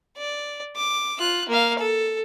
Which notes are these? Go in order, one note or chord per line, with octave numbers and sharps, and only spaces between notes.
D5
D6
F4 F#6
A#3 F5
A4